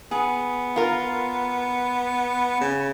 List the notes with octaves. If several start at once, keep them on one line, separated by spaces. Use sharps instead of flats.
B3 G#4
F4 A#4
C#3